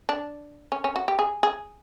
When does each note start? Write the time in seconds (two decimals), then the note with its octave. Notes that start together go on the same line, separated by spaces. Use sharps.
0.09 D4
0.72 C#4
0.84 C#4
0.96 F#4
1.08 G4
1.19 G#4
1.43 G#4